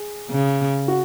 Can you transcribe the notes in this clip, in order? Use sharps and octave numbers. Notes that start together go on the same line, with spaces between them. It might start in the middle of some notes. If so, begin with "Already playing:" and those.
Already playing: G#4
C#3
F#4